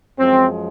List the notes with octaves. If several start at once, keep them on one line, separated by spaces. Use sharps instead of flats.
F#2 F3 G#3 C4